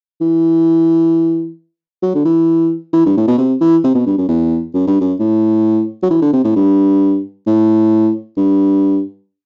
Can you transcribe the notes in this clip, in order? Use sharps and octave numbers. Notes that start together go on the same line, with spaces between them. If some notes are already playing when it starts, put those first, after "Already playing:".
E3
F#3
D3
E3
E3
G2
A2
B2
C3
E3
C3
B2
G2
F#2
E2
F#2
G2
F#2
A2
F#3
E3
D3
C3
A2
G2
A2
G2